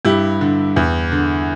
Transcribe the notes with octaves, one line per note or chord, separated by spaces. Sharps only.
G2 E4 G4
D3
E2
D3